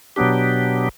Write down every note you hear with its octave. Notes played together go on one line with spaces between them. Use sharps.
B2 F#3 B3 D4 G4